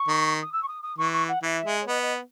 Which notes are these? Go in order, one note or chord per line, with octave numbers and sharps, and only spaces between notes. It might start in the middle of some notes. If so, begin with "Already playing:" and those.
Already playing: C#6
D#3
D#6
E6
C#6
D#6
D#6
E3 C#6
C#6
F#5
E3 E5
G#3
C#5
B3 D#5
D#5